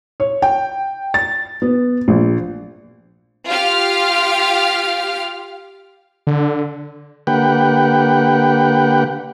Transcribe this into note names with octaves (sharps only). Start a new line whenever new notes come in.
C#5
G5
A6
B3
A#1
F4 G4 F5 F6
D3
D3 A#3 G4 B4 F#5 G5